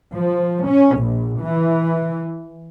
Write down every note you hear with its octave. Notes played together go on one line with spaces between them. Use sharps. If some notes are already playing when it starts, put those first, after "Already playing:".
F3
C#4
A#1
E3